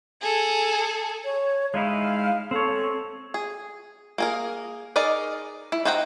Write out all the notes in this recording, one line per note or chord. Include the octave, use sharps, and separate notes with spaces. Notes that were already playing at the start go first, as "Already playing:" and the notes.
G#4 A4
C#5
G#3 D#4 E4 F5
C4 A4 C#5
G#4
A#3 G#4 A#4
D#4 G#4 A#4 D5 D#5
E4
D#4 C5 F#5 G5 A#5